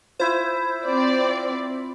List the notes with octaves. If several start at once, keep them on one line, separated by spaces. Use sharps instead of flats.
E4 F4 C5
C4 D5